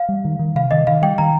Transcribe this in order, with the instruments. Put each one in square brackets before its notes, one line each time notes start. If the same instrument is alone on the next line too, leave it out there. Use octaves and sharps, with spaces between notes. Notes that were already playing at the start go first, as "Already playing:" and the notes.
Already playing: [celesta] F5
[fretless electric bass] G3
D#3
D#3
[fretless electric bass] C3 [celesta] F5
[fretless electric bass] D#3 [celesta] D#5
[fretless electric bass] D#3 [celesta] F5
[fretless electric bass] G3 [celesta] G5
[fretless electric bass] D#3 [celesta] A#5